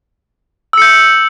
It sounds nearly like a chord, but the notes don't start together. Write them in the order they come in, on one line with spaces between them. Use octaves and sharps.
E6 C#7 G6